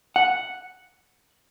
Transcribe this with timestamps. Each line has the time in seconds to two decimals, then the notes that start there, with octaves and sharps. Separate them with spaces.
0.16 F#5